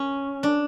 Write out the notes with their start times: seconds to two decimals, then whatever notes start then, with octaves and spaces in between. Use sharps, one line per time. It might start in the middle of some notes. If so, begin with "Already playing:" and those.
Already playing: C#4
0.43 D4